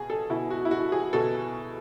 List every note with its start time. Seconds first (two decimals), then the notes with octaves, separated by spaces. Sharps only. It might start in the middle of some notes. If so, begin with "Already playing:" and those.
Already playing: B2 G#4
0.10 A4
0.30 B2 E4
0.50 F#4
0.65 E4
0.71 F#4
0.92 G#4
1.13 B2 A4